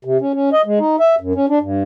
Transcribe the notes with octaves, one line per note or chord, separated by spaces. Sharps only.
C3
C#4
C#4
D#5
G#3
D#4
E5
F#2
C#4
D4
G2